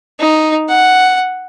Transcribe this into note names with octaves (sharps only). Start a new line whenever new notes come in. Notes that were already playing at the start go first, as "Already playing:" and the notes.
D#4
F#5